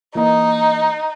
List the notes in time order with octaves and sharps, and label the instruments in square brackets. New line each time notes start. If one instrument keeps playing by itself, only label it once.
[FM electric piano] E3 A#3 D#5 [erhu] D#4